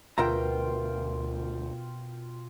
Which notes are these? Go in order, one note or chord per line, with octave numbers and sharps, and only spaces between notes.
D2 B2 F4 A#4 E5 G5 A#5